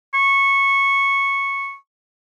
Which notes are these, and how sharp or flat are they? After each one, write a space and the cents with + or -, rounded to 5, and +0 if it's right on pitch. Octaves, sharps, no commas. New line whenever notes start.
C#6 -10